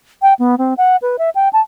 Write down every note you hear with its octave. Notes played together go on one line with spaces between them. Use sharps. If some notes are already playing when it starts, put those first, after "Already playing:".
G5
B3
C4
F#5
B4
E5
G5
A5